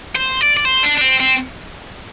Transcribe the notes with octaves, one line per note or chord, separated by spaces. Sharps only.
C5
D5
D5
C5
D4
D4
C4
C4